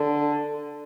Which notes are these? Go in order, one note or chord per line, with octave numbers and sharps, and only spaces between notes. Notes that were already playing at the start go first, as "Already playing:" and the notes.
Already playing: D3